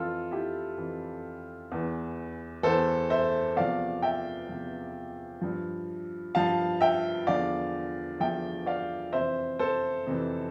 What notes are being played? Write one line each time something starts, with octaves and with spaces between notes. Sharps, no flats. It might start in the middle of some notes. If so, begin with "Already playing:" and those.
Already playing: F2 E3 F4 A4
E4 G4
F2 E3
E2 E3
E2 E3 A4 C5
C5 E5
E2 C3 F3 D5 F5
E5 G5
E2 C3 F3
G2 F3
G2 F3 F5 A5
E5 G5
E2 D3 F3 D5 F5
E2 D3 F3 E5 G5
D5 F5
F2 C3 E3 C5 E5
A4 C5
F2 C3 E3